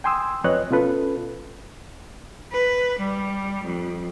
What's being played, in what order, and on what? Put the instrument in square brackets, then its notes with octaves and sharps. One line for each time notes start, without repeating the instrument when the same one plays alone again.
[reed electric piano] G5 G#5 C6 D#6 E6
F2 B4 C#5 D#5 F#6
B2 C#4 F4 A4 B4
[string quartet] B4
G3
F2